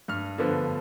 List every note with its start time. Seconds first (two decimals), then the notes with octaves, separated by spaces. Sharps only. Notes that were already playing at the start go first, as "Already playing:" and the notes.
0.08 G2 F6
0.38 D3 F3 B3